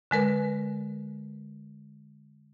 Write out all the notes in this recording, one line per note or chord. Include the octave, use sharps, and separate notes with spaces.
D3 G#3 A#4 B4